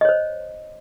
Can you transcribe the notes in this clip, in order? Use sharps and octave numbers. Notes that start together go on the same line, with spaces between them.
C5 C#5 D#5